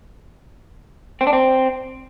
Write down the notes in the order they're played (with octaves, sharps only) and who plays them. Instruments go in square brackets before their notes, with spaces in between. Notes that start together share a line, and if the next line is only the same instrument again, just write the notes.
[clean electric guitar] C4
D4
C4